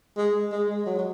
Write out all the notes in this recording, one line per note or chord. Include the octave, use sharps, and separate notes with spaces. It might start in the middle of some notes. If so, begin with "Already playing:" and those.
G#3
G#3
G#3
F#3
F#3